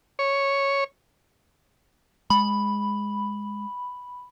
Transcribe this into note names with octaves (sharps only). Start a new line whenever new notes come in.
C#5
G#3 B5